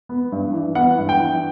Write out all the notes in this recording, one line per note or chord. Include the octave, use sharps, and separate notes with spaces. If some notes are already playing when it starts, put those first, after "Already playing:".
B3
G2
E3
B3 F#5
G2
G5
E3